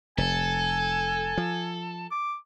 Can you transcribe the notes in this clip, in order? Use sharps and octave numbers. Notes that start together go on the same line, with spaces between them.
F1 A4 G#5
F3
D6